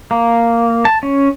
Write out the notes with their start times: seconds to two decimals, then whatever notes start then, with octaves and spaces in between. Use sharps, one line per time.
0.11 A#3
0.85 A5
1.03 C#4